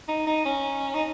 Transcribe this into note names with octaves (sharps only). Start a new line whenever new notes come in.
D#4
D#4
C#4
D#4